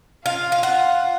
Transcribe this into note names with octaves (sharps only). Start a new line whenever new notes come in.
F4 F5
F5
F4 F#5